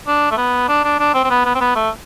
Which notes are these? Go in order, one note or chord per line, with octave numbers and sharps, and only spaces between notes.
D4
A3
B3
D4
D4
D4
C4
C4
B3
B3
C4
B3
A3